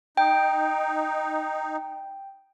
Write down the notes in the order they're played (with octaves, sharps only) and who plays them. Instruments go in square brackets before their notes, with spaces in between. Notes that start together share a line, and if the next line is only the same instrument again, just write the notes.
[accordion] D#4 [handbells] G5